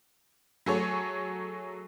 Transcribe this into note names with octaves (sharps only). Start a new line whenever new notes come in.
F#3 A3 G#4 A4 C#5